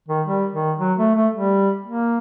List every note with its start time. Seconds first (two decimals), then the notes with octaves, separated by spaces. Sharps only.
0.08 D#3
0.26 G3
0.53 D#3
0.80 F#3
0.98 A3
1.15 A3
1.33 G3
1.85 A#3